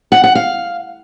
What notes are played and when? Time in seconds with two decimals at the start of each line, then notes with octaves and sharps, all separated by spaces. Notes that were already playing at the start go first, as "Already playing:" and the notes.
0.12 F#5
0.24 F#5
0.35 F5